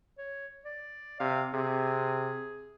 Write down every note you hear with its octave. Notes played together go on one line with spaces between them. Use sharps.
C#5
D5
C3 F5
C3 G#4